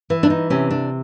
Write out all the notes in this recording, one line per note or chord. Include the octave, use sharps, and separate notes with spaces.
E3
D4
D#4
C3 C#4
D4